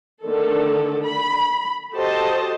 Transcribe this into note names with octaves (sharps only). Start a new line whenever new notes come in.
D3 D#3 A3 A4
B5
F#4 G4 A4 C5 D#5 A5